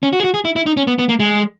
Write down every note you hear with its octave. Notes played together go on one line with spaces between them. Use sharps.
C#4
F#4
G#4
F#4
G#4
E4
E4
D#4
C#4
B3
B3
A#3
G#3